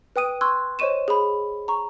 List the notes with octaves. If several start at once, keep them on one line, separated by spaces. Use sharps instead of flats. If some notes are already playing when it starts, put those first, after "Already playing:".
B4 G5 D#6 D#7
C6 C#6 E6 F#6 G#6
C5 C#5 D#5 C#6 D#7 E7
G#4 B5
A#5 C#6